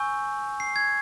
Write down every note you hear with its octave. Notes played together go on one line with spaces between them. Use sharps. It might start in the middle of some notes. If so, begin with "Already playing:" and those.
Already playing: G#5 C#6 E6 G6
C7
G#6